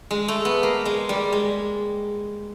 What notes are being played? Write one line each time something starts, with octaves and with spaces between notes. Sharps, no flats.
G#3
A3
B3
A#3
G#3
G3
G#3